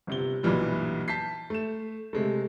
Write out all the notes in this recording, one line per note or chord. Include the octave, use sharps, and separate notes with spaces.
G1 C3 G7
B1 G2 A#2 E3 G3
A5 G6 B6 C7
A3 E7
C3 G#3 A3